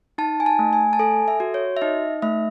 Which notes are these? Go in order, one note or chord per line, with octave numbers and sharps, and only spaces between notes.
D#4 A5
G#5
A5
A3
G#5
A5
A4 G#5
E5
F#4
C#5
E5
D#4 D#5
A3 E5